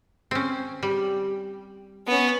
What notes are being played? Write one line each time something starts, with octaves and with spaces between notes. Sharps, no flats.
C4 C#4
G3
B3 C#4